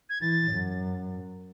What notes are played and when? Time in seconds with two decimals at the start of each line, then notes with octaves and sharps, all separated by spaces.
0.10 G#6
0.21 E3 A6
0.52 F#2